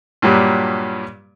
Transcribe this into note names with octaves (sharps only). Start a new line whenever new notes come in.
G2 A#2 F#3 G3